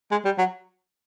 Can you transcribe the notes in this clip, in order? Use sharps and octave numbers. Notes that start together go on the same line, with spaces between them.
G#3
G3
F#3